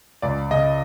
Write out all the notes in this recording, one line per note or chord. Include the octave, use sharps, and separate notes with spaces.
C#2 D5
C#3 D#5